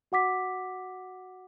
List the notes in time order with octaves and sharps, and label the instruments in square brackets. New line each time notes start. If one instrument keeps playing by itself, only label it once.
[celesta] F#4 F#5 D6 B6